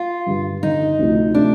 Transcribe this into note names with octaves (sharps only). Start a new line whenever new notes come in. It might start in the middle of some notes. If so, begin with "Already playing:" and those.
Already playing: F4
G2 D3 G3
G2 D3 G3 D#4
D2 C3 F3 A3
C3 F3 A3 D4